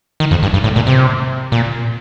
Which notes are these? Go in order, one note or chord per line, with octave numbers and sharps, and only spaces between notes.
D#3
F2
G2
G2
A2
A#2
C3
A#2